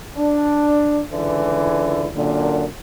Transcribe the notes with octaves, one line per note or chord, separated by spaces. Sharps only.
D4
C#2 D3 E3 E4
F#2 A#2 D3